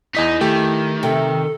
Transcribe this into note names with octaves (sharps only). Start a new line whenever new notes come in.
E2 D#4 E4 D#5 B6
D#3 A3 G4
C3 A4